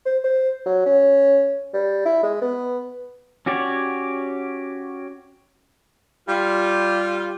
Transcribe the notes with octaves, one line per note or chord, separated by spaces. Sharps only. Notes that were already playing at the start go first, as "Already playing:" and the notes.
C5
C5
F#3
C#4
G3
E4
G#3
B3
C#4 F#4 G4 C#5 D5
G3 F4